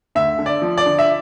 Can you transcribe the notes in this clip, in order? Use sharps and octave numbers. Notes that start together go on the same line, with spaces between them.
D2 E5
D3
D5
F3
D5
D3
E5